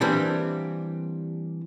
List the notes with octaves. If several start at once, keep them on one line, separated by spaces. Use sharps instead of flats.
E3 G3 A#3 C4 D4